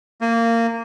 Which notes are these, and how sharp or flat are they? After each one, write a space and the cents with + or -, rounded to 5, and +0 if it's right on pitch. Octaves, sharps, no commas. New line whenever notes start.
A#3 -20